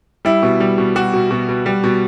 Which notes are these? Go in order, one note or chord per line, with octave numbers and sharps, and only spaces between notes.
G3 E4
B2
G3
B2
G3 F#4
B2
B2
B2
G3
B2